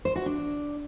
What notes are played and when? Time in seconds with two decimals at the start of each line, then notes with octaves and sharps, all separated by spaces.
0.05 C5
0.16 F#4
0.26 D4